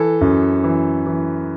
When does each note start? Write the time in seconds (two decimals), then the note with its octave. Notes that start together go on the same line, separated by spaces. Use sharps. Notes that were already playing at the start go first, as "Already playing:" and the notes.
Already playing: E3 A4
0.21 F#2
0.64 E3
1.07 E3